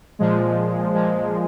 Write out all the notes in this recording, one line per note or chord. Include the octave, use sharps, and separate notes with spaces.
A#2 F3 G#3
A#2 F3 G#3